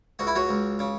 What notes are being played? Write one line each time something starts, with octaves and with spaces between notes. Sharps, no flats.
C#2 F#4
E4
F#3 F#4
C#2
C#3